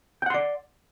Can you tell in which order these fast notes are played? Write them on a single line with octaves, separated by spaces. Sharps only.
G5 F#5 C6 D5